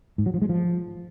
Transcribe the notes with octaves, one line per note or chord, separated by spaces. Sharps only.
G#2
F#3
F3
G#3
F3